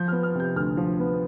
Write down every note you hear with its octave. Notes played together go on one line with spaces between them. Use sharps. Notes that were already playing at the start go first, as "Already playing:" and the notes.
Already playing: F3 G6
B3 F6
F6
C3 G6
D2 F6
F3
B3